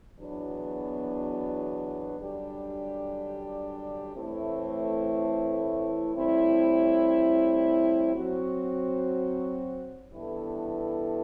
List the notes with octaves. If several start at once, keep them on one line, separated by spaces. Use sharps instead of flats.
E2 B2 F#3 B3 D4
F#2 D3 G3 D4 G4
A2 E3 A3 C4 E4
A2 G3 C4 E4
F#3 C4 F#4
G2 E3 B3 E4 A4